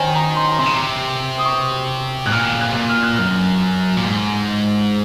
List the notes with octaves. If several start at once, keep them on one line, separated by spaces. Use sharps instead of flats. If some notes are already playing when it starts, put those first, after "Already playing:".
Already playing: D#3 C5 C#5 G#5
A#5
C6
A#5
C3 C6
C#3
C3
D#6
C#6
G#2 F#6
A#2 F6
D#3
C#3
C3 F#6
A#2
F6
F#6
F#2 F6
A#2
G#2